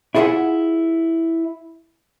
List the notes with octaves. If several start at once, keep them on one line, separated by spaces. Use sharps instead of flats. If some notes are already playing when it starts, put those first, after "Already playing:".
E4 F4 G#4 C#5 E5 F#5